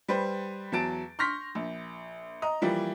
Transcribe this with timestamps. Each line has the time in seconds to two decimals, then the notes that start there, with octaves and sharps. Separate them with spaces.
0.08 G3 B4 C5
0.72 E2 F#3 A5 A6 D7
1.19 C6 C#6 F6 G6 A#6 B6
1.55 A#1
2.42 D#5 A#5 D#6
2.61 E3 F3 G3 A#3